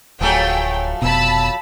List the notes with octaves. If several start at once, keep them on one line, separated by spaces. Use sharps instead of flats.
D1 F3 F#3 A3 G#4 G5
F1 B2 A5 B5 E6